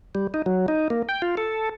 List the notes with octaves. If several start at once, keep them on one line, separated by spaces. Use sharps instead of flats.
G3
D#4
F#3
D#4
A#3
G5
F4
A4